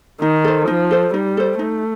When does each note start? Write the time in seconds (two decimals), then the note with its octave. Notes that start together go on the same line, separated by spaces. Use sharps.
0.21 D#3 D#4
0.44 A4 C5
0.68 F3 D#4
0.91 A4 C5
1.14 G3 D#4
1.37 A4 C5
1.59 A3 D#4